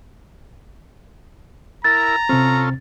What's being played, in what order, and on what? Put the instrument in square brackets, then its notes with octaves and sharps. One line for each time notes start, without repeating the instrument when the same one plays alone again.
[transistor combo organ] E4 A#4 [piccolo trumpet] A#5 [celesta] A6
[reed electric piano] C3 C4 [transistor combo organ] C#4 F4 A4